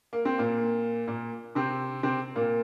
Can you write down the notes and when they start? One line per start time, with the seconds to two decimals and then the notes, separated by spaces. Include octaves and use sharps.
0.13 A#3
0.25 C4
0.38 A#2 A#3
1.08 A#2 A#3
1.55 C3 C4
2.03 C3 C4
2.35 A#2 A#3